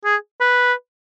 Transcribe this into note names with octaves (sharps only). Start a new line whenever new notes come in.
G#4
B4